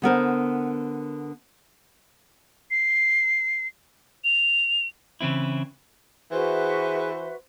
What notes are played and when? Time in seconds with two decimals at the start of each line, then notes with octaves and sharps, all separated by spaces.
0.02 D3 B3 A#4 C5
2.71 C7
4.24 F7
5.21 C#3 E3 C4 E4
6.32 E3 F#4 G#4 B4 C5 E5